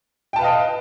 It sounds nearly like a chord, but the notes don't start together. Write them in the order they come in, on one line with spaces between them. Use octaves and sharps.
G5 A5 B4 F5 D#5